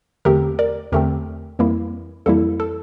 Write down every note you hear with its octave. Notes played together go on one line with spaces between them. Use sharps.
E2 D3 A3 C4 G4 A#4
A#4 D5
E2 D3 A3 C4 G4 A#4
F2 E3 G3 A#3 E4
F2 E3 G3 A#3 E4 A4
A4